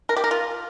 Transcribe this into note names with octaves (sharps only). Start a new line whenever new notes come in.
A#4
G4
A#4
F4